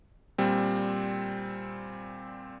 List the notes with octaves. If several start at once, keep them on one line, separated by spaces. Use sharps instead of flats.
A#2 G3 C4